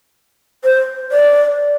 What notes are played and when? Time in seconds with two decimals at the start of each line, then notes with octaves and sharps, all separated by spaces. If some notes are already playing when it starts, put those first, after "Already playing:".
0.64 C5
1.12 D5